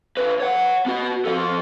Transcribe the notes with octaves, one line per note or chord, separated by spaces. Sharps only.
D3 B4
C#5 F#5
B3 F#4
F3 A4